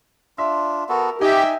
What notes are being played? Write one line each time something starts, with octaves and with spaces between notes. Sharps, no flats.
D4 F4 E5
B3 F#4 A4 A#4
D#4 G4 E5 G5 G#5